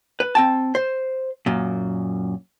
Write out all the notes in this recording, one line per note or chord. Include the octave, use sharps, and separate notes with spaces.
B4
C4 G5 A5
C5
F#2 A#2